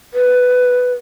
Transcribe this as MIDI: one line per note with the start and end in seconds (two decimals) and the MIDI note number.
0.14 0.92 71